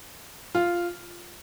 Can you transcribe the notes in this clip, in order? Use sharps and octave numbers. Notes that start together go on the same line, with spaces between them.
F4